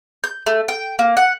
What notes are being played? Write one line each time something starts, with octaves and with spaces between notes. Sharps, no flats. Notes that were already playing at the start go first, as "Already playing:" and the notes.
G6
A3
G5
A#3
F#5